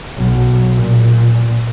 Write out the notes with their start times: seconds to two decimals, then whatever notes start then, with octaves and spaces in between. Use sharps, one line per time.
0.18 B1
0.74 A#2